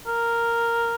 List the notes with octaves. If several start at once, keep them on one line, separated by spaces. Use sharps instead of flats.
A#4